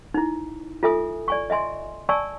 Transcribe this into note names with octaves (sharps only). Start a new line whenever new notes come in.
D#4 E4
F4 A4 E5 G#5 D#6
D5 G#5 C#6
D#5 E5 G#5 C6
D5 G#5 A5 C#6 E6